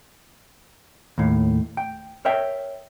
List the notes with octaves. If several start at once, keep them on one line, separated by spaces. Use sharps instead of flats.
D#2 A2
G5
A#4 C#5 E5 G5